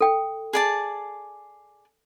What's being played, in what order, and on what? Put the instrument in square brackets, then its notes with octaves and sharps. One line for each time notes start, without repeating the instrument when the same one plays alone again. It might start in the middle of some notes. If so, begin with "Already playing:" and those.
[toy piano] A4 G5
[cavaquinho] G#4 D5 A5